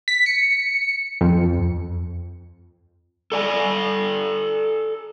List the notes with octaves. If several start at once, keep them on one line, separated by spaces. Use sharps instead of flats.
B6
C#7
F2
A4 D5 G#5